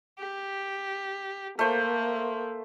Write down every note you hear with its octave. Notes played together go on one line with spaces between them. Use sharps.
G4
A3 A#3 C5